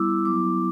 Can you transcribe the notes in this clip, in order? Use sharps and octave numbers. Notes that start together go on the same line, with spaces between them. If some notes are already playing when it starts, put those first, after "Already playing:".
Already playing: G3 B3 E4 D6 E6
F#3 B3 E4 D6